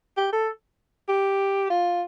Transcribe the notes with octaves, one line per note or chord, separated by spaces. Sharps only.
G4
A4
G4
F4